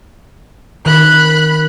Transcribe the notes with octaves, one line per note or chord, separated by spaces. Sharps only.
D#3 B5 F#6